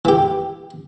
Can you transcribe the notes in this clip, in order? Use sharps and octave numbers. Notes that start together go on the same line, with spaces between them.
E3 G4